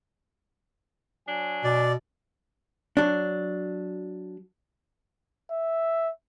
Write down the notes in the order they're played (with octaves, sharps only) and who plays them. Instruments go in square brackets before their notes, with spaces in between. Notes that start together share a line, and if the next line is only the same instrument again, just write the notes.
[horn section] F#3 D4 G#5
[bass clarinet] B2 [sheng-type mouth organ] D5
[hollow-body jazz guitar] F#3 D4
[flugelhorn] E5